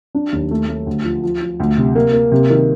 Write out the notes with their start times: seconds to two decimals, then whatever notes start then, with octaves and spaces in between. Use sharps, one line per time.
0.15 D4
0.32 D#2
0.51 A3
0.69 A3
0.87 D2
1.05 F3
1.23 F3
1.41 F3
1.60 D2
1.77 C3
1.95 A#3
2.13 A#3
2.32 C3
2.50 D#3